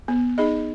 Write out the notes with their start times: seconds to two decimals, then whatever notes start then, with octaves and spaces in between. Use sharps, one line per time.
0.08 B3
0.38 D#4 G#4 D#5